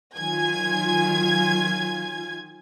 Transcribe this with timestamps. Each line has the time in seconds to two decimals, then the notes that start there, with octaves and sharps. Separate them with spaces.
0.17 D#3 F#3 F4 G#5 G#6